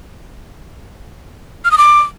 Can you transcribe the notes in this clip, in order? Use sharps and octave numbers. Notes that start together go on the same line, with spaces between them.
F6
D#6
D6